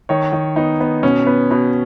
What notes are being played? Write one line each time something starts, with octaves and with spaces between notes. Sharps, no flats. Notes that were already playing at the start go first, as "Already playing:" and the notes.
D#3 C#5
D#3
B3 D#4
B3
B2 C#4
B3
B2